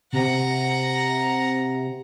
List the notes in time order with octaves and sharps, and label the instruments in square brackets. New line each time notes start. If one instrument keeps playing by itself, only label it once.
[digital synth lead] C3 [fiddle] F#5 A#5